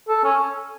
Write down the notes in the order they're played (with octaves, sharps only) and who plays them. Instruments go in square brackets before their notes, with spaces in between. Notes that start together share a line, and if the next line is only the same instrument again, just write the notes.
[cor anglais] A4
C#4